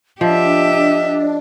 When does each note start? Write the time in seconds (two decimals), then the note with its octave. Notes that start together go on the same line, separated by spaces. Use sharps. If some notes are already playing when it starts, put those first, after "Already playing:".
0.21 F3 D4 G4 D#5 E5